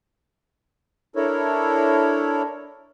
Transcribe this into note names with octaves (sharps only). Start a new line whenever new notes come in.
D4 E4 A4 A#4 C#5